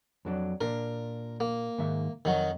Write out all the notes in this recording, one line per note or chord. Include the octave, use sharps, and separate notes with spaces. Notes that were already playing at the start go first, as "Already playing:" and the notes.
F2 F#3 D4
A#2 D4 A#4
A#3
G#2 D#3 E5
F2 D#3 F#3